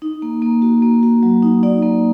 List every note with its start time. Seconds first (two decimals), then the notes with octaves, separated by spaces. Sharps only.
0.02 D#4
0.22 A#3
0.42 A#3
0.62 F#4
0.82 A#3
1.03 F#4
1.23 F#3
1.43 D#4
1.63 D#4 D5
1.83 A#3